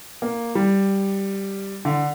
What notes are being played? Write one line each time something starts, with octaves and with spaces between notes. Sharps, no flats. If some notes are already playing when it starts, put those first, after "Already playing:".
A#3
G3
D3